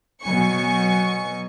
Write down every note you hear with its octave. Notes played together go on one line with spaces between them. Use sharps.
B2 F#3 G#5 C#6 C#7